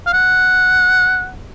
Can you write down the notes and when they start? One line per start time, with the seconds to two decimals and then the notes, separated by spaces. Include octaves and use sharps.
0.07 F5
0.13 F#5